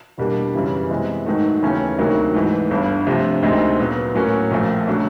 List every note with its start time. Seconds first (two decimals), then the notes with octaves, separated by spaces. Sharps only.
0.18 E2 B2 G3 A#3 D4
0.54 F#2 C#3 E3 G3
0.90 C3 E3 G#3 B3
1.26 G#2 D#3 F#3 A3
1.62 D#2 C#3 E3 A3 C#4
1.98 D2 C3 D#3 F#3 A#3
2.34 G#2 E3 A3
2.71 G1 G2 D3
3.07 C3 F3 A3 D4
3.43 D2 C3 D#3 G#3 C4
3.79 A#2 F#3 B3
4.15 A2 F#3 A#3 C#4
4.51 A#1 A#2 F3 A3
4.87 C#3 F#3 A3 D4